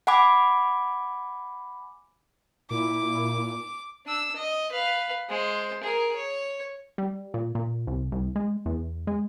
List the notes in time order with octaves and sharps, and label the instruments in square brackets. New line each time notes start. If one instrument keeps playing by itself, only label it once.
[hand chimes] F#5 G#5 B5 D6
[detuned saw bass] A#2 [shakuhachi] E4 [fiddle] D6
[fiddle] D4 E6
D#5
B4 F5
G#3 C5
G#4 A#4
C#5
[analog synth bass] G3
A#2
A#2
C2
C2
G#3
E2
G#3